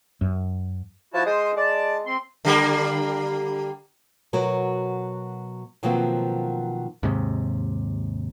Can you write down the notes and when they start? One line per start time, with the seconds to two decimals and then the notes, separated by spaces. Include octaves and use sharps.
0.21 F#2
1.14 F3 E4 F#4 A5
1.26 G#3 C5 D#6
1.56 G#3 D5 A5
2.06 C4 C6
2.45 D3 G3 A#3
4.33 B2 F#3 F#4 A#4
5.83 B2 D#3 F3 F#3 A#3 C4
7.03 D#2 G#2 C3